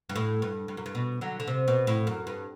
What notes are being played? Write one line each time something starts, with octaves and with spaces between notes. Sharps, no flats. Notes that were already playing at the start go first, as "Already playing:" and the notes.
G2
A2
G2
G2
F#2
G2
B2
D3 F#3
D3
C3
B2
A2
F#2
G2